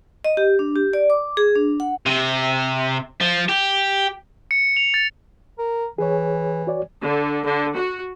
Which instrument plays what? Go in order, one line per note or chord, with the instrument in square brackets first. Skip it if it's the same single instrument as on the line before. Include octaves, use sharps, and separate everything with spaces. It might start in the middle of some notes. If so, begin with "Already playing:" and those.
[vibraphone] D#5
G4
D4
G4
D5
D6
G#4
D4
F#5
[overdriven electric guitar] C3
F3
G4
[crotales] C#7
F7
A6
[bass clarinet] A#4
[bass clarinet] E3 [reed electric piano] G#4 C#5
[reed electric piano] F#4 C#5 D5
[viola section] D3
D3
F#4